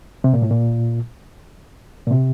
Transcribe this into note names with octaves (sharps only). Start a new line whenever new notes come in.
C3
A#2
A2
A#2
A#2
C3